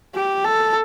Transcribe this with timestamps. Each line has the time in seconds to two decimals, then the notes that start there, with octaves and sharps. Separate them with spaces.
0.15 G4
0.45 A4